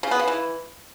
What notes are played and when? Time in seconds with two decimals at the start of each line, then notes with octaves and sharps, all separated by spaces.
0.03 C#3
0.11 B3
0.19 C#3
0.28 E3